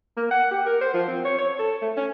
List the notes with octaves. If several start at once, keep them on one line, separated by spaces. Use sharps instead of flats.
A#3
F#5
G4
A#4
C5
F3
C4
C#5
C#5
A4
A3
C#4